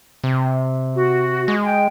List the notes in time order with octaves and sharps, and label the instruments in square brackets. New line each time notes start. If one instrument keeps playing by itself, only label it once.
[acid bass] C3
[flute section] F#4
[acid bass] G#3
[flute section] G5